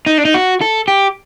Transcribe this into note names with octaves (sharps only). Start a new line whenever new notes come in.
D#4
D4
D#4
F#4
A4
G4